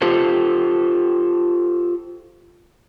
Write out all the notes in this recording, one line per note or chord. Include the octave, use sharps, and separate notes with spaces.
F4 G4 A4 C5